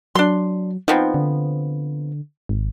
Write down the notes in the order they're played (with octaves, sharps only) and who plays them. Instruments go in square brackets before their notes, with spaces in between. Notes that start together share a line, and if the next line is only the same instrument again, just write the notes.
[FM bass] F#3 [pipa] D4 C6
[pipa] F3 B3 C4 [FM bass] D#4
[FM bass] D3
G#1